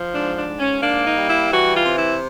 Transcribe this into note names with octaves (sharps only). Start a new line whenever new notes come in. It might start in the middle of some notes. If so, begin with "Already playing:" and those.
Already playing: F3
G#2 D4
D4
G#2
C#4
A#3 D4
D#4
G3
E4
E3 F#4
F4
C3
E4